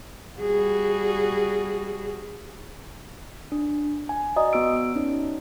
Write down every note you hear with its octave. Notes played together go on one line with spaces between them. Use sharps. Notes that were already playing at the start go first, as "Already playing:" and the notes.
G3 F#4 G#4
D4
G#5
F#4 D5 D#5 A#5 D#6
B3 F#4 D5 E6 D7
C#4 D#4